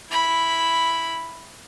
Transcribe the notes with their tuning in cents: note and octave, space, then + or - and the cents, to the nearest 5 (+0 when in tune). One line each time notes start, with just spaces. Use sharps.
E4 +0 B5 +0